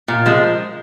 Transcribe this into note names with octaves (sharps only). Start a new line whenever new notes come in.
A#2
F3 G#3